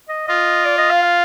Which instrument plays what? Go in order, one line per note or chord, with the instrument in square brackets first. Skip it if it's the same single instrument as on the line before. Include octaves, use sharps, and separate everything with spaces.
[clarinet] D#5
[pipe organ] F4 [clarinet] D#5
[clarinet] D5
D#5
F5
F5